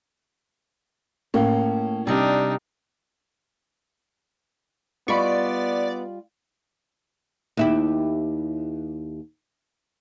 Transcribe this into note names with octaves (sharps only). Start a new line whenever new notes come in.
A2 A#3 C#4
C3 G3 D4 D#4
G3 B3 F4 D5 D#5 B5 C#6
D#2 E4 G4